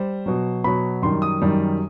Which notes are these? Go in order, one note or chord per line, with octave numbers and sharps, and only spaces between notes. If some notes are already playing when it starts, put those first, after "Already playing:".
Already playing: G3 C5
B2 F#3
B2 F#3 B5
F#2 D#3 G3 C6
D#6
F#2 D#3 G3